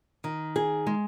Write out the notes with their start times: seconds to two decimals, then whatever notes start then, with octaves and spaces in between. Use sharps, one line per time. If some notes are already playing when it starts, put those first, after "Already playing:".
0.24 D#3
0.56 G#4
0.87 G#3